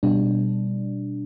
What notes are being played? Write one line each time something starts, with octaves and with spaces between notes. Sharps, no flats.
B2 G3 D4